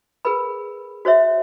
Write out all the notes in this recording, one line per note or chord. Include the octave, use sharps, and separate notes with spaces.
G#4 A#4 B4 B5
F#4 C5 C#5 E5